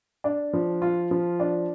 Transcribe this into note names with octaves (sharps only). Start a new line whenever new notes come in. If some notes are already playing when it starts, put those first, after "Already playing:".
D4
F3
F4
F3
D4